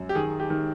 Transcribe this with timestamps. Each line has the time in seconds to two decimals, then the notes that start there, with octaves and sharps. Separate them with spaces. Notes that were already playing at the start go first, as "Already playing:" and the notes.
Already playing: F#2
0.09 G4
0.15 D#3 G#4
0.40 G4
0.50 D#3